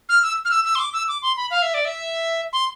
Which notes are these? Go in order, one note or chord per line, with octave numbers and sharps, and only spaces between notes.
F6
E6
F6
E6
E6
C6
D6
E6
D6
C6
B5
F5
E5
D5
E5
C6